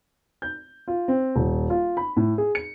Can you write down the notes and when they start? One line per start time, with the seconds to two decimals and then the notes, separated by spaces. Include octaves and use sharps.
0.42 G6
0.88 F4
1.08 C4
1.36 D#1
1.70 F4
1.97 B5
2.17 A2
2.38 G#4
2.55 C#7